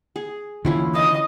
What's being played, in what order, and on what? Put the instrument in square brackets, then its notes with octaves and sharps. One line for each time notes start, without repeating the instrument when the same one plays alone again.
[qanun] G#4
[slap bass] D3 E3 A#3 [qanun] C#4 E4 F4
[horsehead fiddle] D#5 [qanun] A5